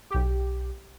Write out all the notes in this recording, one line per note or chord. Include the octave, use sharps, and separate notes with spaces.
B1 G4